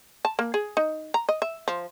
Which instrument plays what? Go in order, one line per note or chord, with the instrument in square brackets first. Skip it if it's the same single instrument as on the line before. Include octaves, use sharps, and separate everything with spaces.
[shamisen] A5
A#3
G#4
D#4
A#5
D#5
E5
F3